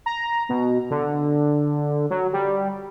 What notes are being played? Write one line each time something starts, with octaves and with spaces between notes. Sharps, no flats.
A#5
B2
D3
F#3
G3